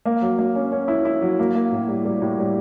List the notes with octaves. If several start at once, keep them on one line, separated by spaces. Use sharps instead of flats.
A#3
F#3
A#3
C#4
C#4
E4
E4
F#3
A#3
A#3
A2
G3
G3
A2
G3